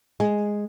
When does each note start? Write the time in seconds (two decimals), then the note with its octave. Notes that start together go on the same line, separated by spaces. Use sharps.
0.20 G#3